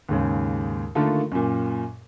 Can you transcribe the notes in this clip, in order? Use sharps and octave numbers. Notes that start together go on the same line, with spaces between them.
D#2 G#2 C#3
D3 D#3 A3 A#3 F4 A4
F#2 A#2